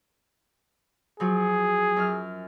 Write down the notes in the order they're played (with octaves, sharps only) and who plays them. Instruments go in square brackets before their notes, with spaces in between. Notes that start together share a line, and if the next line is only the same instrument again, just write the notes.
[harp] F3 F#3 [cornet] G#4
[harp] F#2 F6